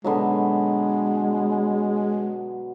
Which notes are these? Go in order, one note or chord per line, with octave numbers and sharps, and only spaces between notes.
B2 D3 F#3 G#3